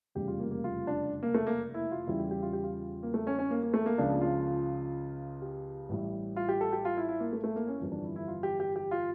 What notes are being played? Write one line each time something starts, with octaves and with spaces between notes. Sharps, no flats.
F1 E2 C#3 G3 G4
F4
A#3
A#3
F4
D4
A#3
A3
A#3
E4
F4
E2 C#3 G3 E4
G4
G4
F4
G4
F4
A#3
A3
C#4
C#4
A#3
A#3
A3
A#3
C#2 C#3 F3 D4
F4
G4
A1 A2 G3
F4
G4
A4
G4
F4
E4
E4
A#3
A3
A3
A#3
C#4
G1 F2 E3 G3
D4
E4
E4
F4
G4
G4
G4
F4